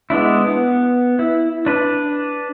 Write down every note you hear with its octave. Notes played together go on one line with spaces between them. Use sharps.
G#3 B3 D4 E4
B3
E4
D4 B4